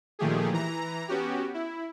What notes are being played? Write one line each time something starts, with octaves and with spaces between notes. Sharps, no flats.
A#2 D#3 F3 A3 G4 G#4
E3 A#5
B3 C#4 F#4 G4
E4